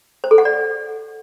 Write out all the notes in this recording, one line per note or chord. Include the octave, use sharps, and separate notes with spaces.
C5
A4
F#5
D5